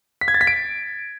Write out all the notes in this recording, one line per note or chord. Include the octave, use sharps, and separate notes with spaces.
B6
G#6
A6
B6
D7